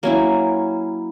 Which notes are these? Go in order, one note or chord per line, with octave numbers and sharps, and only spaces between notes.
F#3 A#3 C#4 E4